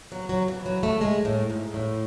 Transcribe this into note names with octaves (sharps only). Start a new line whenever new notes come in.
F#3
F#3
E3
F#3
A3
G#3
A2
G#2
G#2
A2